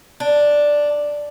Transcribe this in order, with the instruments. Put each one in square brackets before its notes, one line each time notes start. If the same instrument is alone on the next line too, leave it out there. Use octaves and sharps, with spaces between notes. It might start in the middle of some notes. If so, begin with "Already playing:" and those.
[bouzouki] D4